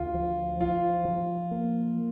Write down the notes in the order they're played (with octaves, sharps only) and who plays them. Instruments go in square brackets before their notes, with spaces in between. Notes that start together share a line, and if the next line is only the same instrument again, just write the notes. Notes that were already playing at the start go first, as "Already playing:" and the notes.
Already playing: [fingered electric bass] D2 [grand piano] F4
[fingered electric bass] F3
[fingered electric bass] F3 [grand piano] F4
[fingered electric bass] F3
A#3